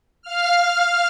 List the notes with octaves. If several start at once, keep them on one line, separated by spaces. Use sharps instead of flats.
F5 F6